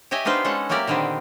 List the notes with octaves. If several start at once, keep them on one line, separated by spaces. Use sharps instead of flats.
G4 C#5 D#5 E5 G#5
B3 D4 D#4 F4 B4 C5
G#3 C#4 A4 F#5
F#3 A#3 G4 A#4 D5 E5
A#2 D3 D#3 B3 C4